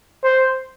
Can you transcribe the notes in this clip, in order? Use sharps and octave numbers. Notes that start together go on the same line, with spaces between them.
C5